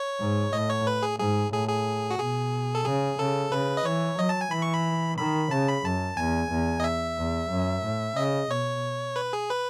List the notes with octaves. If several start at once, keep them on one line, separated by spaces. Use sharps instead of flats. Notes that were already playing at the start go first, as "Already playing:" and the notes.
Already playing: C#5
G#2
A2 D#5
C#5
B4
G#4
G#2 G#4
A2 G#4
G#4
F#4
B2 G#4
A4
C#3 G#4
C#3 A4
C#3 B4
D#5
E3 C#5
F#3 D#5
A5
G#5
E3 B5
C#6
B5
D#3 B5
C#3 A5
B5
F#2 A5
E2 G#5
E2
D#5
E5
E2
F#2
A2
C#3 D#5
B2 C#5
B4
G#4
B4